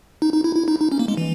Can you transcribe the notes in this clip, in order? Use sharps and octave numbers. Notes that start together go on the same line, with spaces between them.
D#4
D#4
E4
E4
D#4
D#4
C#4
A#3
G#3
E3